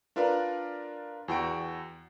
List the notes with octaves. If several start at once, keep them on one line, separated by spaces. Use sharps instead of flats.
D4 F4 A#4 B4 D5 A#5
E2 F#4 G5 D7